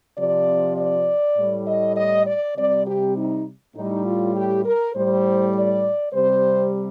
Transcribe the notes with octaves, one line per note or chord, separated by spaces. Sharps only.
C3 F3 D5
D5
A2 G3
D#5
D#5
D5
C3 G3 D5
G4
D#4
A2 G3 D#4
F4
G4
A#4
A2 G3 C5
D5
C3 G3 C5